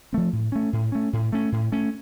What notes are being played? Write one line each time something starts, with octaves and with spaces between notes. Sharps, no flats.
F3 A3 C4
A2
A3 C#4
A2
A3 C#4
A2
A3 C#4
A2
A3 C#4